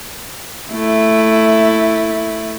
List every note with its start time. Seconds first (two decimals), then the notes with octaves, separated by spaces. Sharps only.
0.72 A3 E4